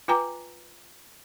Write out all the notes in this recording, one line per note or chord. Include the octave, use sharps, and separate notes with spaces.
F4 B4 G5 G#5 A#5 D6